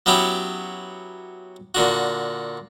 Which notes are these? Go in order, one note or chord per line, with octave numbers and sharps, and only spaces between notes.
F#3 B3 C#4 E4 G4
A#2 D3 F#4